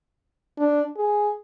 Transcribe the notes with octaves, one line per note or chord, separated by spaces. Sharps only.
D4
G#4